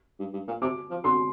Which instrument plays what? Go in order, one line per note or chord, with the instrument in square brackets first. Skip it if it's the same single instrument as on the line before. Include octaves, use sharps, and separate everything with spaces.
[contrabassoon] G2
G2
A#2
[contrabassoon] C3 [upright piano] D6
[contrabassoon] F3
[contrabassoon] D3 [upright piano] C6